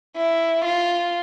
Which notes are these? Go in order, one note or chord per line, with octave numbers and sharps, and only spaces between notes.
E4
F4